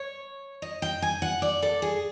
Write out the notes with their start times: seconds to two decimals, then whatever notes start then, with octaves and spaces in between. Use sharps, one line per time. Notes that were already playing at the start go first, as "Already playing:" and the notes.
Already playing: C#5
0.62 D#5
0.82 G5
1.02 G#5
1.22 F#5
1.42 D5
1.62 A4
1.82 G#4